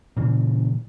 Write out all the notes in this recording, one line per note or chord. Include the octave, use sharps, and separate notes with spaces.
A#2 C#3 E3